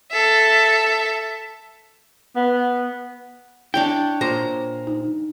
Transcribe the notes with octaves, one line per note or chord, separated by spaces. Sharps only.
A4 E5
B3
D4 E4 C#5 G5 A5
A#2 C5 A#5
D#4